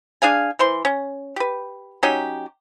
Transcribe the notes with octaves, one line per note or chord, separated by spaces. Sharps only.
D4 G#4 F5 G#5
E3 C5 C6
C#4
G4 B4
F#3 C#4 D#4 G4